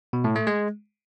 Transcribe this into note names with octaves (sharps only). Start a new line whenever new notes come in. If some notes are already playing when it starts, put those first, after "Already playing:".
B2
A2
A3
G#3